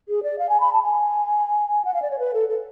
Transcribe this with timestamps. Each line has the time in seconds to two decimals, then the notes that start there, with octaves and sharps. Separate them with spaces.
0.09 G#4
0.23 D5
0.39 F5
0.49 G#5
0.60 B5
0.73 A5
0.83 G#5
1.85 F#5
1.94 F5
2.02 D5
2.11 C#5
2.19 B4
2.34 A4
2.49 A4